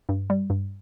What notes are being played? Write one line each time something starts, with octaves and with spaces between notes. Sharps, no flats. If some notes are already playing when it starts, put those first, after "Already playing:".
G2
G3
G2